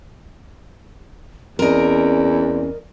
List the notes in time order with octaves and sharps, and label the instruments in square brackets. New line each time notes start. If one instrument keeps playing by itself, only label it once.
[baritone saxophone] E2 [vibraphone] C4 D5 [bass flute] C#4 [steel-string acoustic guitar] A#4 D#5